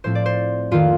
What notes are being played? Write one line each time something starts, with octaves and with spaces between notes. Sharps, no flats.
A2 F3 C4 C5
D5
C5
F2 D#3 A#3 F4